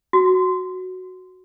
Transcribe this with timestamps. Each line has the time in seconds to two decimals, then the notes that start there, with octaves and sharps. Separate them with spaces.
0.13 F#4